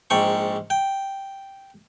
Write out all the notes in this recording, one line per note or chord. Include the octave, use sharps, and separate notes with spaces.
A#1 G#2 G5 C#6
G5